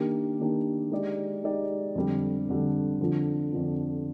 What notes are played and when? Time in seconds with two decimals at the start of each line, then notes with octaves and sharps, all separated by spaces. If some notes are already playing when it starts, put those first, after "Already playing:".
Already playing: D#3 A#3 D4 G4
0.39 D#3 A#3 D4 G4
0.91 G#3 D#4 G4 D5
1.43 G#3 D#4 G4 D5
1.95 F2 D3 G3
2.48 F2 D3 G3
3.00 F2 D3 F3
3.52 F2 D3 F3